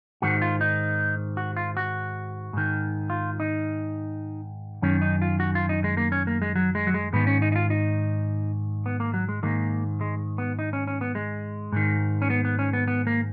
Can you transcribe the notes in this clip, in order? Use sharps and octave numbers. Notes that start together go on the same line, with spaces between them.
G#2 D#3 F#4
F4
D#4
F#4
F4
F#4
G#2 D#3
F4
D#4
F#2 D#3 C#4
D#4
F4
F#4
F4
D#4
G#3
A#3
C#4
A#3
G#3
F#3
G#3
F#3
G#3
G#2 D#3 B3
C#4
D#4
D#4
F4
D#4
B3
A#3
F#3
G#3
G#2 D#3 A#3
G#3
B3
D#4
C#4
C#4
B3
G#3
G#2 D#3
C#4
B3
B3
C#4
B3
B3
A#3